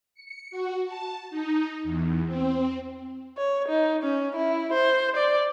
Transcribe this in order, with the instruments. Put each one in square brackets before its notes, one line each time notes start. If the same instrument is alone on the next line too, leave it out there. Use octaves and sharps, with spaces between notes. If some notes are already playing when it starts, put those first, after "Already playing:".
[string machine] C#7
F#4
A5
D#4
E2
C4
[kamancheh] C#5
D#4
C#4
E4
C5
D5